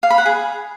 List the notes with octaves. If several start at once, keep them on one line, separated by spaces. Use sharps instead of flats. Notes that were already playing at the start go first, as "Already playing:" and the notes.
F5
B5
F#5
G#4